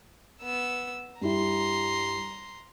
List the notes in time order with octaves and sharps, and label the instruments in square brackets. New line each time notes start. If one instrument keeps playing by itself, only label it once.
[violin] B3 E6
[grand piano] G2 G3 E4 [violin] A#5 C6